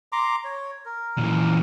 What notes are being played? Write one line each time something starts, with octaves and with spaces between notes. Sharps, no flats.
A#5 C6 D6
C#5
A#4
A#2 E3